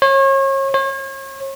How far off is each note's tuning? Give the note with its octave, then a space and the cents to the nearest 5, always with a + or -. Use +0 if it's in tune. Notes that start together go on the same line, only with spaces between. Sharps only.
C#5 -35
C#5 -40